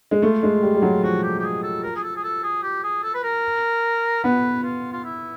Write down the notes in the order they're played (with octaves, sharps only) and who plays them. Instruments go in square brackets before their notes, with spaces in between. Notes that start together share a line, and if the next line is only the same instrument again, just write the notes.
[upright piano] G#3
[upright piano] A3 [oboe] F4
[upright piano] G#3
G3
G3
F#3
[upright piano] F3 [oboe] F#4
[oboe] G4
G4
G#4
A4
A#4
G#4
A4
G#4
A4
G#4
G4
G#4
A4
B4
A#4
[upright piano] B3 [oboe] B4
[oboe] F4
F4
E4